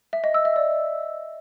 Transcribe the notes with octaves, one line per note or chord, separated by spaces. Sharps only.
E5
D#5
E6
E5
D5